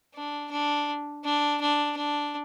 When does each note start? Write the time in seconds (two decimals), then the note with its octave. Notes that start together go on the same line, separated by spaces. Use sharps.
0.15 D4
0.51 D4
1.24 D4
1.61 D4
1.97 D4